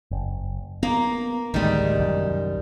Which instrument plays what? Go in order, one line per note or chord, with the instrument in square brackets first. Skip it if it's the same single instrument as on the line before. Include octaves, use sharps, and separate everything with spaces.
[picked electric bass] F#1
[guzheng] A#3 [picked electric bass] B3
[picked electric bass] A1 D2 G#3 [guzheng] D#3 G3
[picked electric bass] C2 F#2